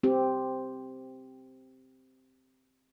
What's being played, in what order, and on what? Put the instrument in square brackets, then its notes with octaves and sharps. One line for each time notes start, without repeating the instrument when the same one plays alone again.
[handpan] C4 G4